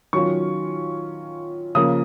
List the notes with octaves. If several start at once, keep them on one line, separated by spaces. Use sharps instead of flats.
D#3 F#3 C#4 F4 C#6
C#3 F3 A#3 D#6